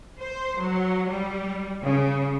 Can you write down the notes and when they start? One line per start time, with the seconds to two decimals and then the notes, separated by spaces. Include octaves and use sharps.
0.19 C5
0.59 F#3
1.08 G3
1.83 C#3